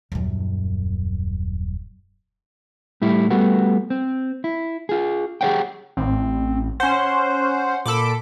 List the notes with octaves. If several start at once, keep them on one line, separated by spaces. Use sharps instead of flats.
D#1 F#2
A2 G3 E4
G3 A3 B3 F#4
C4
E4
F4 G#4
G4 G#4 A#4 C#5 F#5 G5
A1 C4
C#4 C5 F#5
A#2 A4 B5 D6